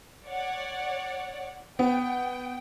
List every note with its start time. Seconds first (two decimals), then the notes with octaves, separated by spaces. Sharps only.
0.25 C#5 D5 F#5
1.79 B3 G5